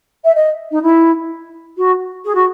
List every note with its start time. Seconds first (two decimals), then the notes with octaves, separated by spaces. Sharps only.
0.24 E5
0.35 D#5
0.71 D#4
0.82 E4
1.77 F#4
2.24 G#4
2.34 F#4